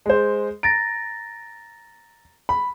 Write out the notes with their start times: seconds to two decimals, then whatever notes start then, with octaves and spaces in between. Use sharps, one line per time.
0.06 G#3 C5
0.63 A#5 A6 A#6 D7
2.49 B5